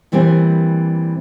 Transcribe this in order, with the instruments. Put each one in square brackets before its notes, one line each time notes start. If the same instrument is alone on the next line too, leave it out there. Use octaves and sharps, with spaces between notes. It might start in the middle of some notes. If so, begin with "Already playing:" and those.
[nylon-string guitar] A#2 E3 G3 B3 C4